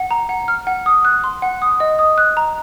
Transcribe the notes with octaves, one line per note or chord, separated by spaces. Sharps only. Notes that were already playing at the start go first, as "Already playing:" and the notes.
Already playing: F#5
A#5
F#5
F6
F#5
D#6
F#6
C6
F#5
D#6
D#5
D#6
F#6
A#5